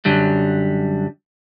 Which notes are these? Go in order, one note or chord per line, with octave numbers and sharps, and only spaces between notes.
F#2 D3 F#3 G3